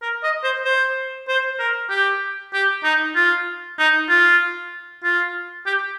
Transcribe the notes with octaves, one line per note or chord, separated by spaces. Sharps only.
A#4
D#5
C5
C5
C5
A#4
G4
G4
D#4
F4
D#4
F4
F4
G4